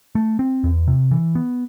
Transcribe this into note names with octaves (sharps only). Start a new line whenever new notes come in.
A3
C4
E2
C3
E3
B3